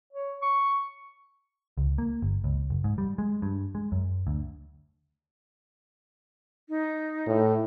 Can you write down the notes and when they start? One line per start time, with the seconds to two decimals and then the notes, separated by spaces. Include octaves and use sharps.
0.13 C#5
0.42 C#6
1.78 C#2
1.98 A#3
2.22 G1
2.44 C#2
2.70 F#1
2.84 G#2
2.98 G3
3.18 G#3
3.42 G2
3.75 G#3
3.92 F#2
4.27 D2
6.69 D#4
7.27 A2